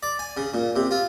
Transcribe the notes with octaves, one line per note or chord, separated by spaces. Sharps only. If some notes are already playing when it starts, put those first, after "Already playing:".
D5
G#5
C#3
A#2
C3
F4